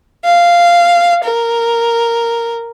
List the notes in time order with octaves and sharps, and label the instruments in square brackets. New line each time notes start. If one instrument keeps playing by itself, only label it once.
[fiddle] F5
A#4